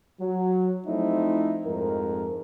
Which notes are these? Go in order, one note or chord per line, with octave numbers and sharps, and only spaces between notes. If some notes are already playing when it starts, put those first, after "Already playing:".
F#3
F3 A3 C4 D#4 E4
F2 G#2 A#4